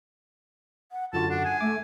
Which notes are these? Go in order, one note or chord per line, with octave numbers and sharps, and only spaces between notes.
F#5
F#2 D3 F4 F#4 A5
D4 F#5
G#5
A3 E5 D6